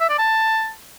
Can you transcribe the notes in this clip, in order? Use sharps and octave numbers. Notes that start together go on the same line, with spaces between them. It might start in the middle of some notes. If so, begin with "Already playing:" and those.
E5
D5
A5